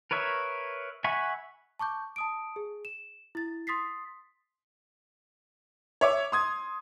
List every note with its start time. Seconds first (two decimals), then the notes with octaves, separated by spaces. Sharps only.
0.11 A#4 B4 C#5 E5
1.04 E5 F#5 G#5 B5 C#6
1.79 A5 C#6 D6 G6
2.16 A5 D#6 D7
2.56 G#4
2.85 E7
3.35 E4 A6
3.67 C6 D#6 A6 B6 C7
6.01 C#5 E5 D6
6.32 C6 D#6 G#6